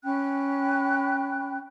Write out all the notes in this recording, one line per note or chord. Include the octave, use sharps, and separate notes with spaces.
C#4 G5 B5 F#6